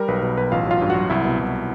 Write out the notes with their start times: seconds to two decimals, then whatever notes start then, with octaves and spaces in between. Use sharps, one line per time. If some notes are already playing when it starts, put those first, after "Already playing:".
Already playing: G3 A#4
0.08 B1 B4
0.22 B2 B4
0.37 B1 B4
0.52 A1 F4 F5
0.66 F#3 F4 F5
0.81 G2
0.90 F#4 F#5
0.95 F#3
1.10 C2 E4 E5
1.25 B2
1.39 C2